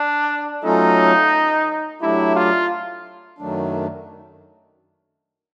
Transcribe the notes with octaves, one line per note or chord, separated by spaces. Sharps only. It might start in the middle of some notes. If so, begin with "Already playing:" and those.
Already playing: D4
F#3 A3 C#4 D#4 F4 A4
F#3 A3 D4 E4 G4
F4
F#2 D#3 F#3 A3 D4